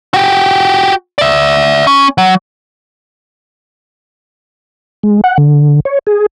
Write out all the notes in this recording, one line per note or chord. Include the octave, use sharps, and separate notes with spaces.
F#4 G4
D5 E5
C#4
F#3
G#3
F#5
D3
C#5
G#4